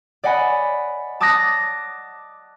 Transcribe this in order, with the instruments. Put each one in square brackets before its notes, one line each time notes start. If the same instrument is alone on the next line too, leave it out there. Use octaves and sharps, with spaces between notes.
[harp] D5 D#5 F#5 G#5 B5
A5 D6 D#6 F#6 A#6